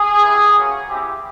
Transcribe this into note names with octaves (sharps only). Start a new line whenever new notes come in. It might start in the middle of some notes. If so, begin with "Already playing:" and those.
Already playing: G#4
B3 E4 G4
A#3 C#4 F#4
C4 E4 G4